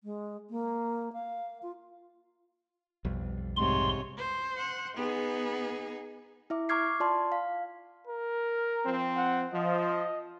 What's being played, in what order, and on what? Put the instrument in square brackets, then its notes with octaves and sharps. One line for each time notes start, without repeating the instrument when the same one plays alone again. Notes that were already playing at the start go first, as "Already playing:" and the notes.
[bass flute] G#3
A#3
F5
F4
[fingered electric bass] B1 F2 G3
[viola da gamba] G#2 C3 C#5 [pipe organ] C6
[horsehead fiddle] C5
[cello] F#5
[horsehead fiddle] B3 [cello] D#4 G#4
[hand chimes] E4 E5 D6
A#5 C#6 D6 F6 G#6 C7
F4 D5 A5 C6
F5
[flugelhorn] A#4
[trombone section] F3 C4
[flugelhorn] F#5
[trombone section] F3 [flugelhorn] D#5